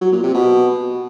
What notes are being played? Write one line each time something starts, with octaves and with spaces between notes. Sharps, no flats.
F#3
A#2
C3
B2